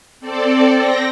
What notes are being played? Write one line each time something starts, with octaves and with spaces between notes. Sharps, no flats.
C4 A4 D5
C4 G5 A#6